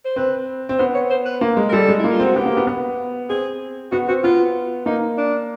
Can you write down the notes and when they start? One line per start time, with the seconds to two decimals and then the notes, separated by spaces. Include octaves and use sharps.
0.05 C5
0.16 C4 B4
0.69 C4
0.78 B3 C5
0.94 C#5
1.10 C5
1.25 B4
1.41 A#3
1.57 G#3
1.69 A#4
1.73 G3 A4
1.89 G#3
1.99 A#3 E4
2.11 F4
2.19 C4 F#4
2.36 B3 G4
2.46 A#3
2.57 B3
2.67 B3
3.29 C4 G#4
3.92 B3 F#4
4.08 C4 F#4
4.23 B3 F4
4.86 A#3 D#4
5.18 D4